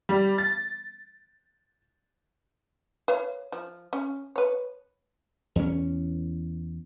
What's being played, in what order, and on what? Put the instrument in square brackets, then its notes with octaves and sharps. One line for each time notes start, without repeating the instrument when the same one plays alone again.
[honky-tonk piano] G3
A6
[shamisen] B4 C#5 F5
F3
C#4
B4 C#5
[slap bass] E2 C#4